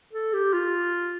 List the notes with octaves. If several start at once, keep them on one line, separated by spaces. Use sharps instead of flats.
A4
G4
F4